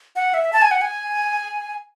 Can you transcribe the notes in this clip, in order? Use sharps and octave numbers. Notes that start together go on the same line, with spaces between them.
F#5
E5
A5
G#5
F#5
G#5